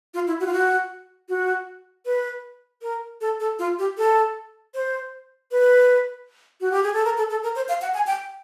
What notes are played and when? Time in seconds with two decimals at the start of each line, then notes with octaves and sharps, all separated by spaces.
0.14 F4
0.27 E4
0.40 F#4
0.46 F4
0.53 F#4
1.29 F#4
2.05 B4
2.82 A#4
3.21 A4
3.40 A4
3.59 F4
3.79 G4
3.98 A4
4.74 C5
5.51 B4
6.61 F#4
6.72 G4
6.83 G#4
6.93 A4
7.05 A#4
7.17 A4
7.30 A4
7.43 A#4
7.56 C5
7.69 F5
7.82 F#5
7.94 G#5
8.07 G5